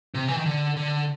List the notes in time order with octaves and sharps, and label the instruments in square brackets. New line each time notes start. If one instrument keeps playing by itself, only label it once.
[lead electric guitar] C3
E3
D#3
D3
D3